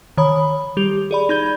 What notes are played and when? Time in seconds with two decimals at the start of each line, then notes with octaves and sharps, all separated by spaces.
0.17 D#3 C#5 B5 D#6
0.77 G3 G4 F7
1.11 G#4 D5 B5
1.29 D#4 B5 G6 G#6 G7